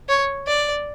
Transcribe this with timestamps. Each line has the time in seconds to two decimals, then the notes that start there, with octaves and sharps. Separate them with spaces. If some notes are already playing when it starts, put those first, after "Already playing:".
0.09 C#5
0.48 D5